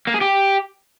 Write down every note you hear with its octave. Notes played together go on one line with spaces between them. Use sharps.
A#3
G#4
G4